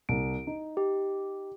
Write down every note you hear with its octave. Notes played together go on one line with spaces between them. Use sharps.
C2 D7
D#4
G4